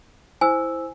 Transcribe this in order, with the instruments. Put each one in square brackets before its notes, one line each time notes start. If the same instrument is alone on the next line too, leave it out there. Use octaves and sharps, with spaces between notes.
[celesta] E4 C5 E6 [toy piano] G#5